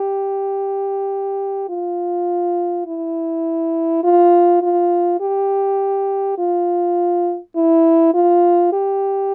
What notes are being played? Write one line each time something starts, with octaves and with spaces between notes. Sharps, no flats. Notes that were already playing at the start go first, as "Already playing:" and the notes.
Already playing: G4
F4
E4
F4
F4
G4
F4
E4
F4
G4